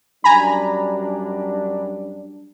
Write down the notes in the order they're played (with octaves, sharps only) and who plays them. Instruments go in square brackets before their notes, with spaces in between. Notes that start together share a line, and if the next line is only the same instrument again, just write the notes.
[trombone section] F#2 G3 D4 [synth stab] G#5 A#5 B5